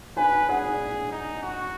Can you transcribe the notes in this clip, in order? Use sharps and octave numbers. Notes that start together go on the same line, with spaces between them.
B4 G#5
G#4 F#5
D#4
F#4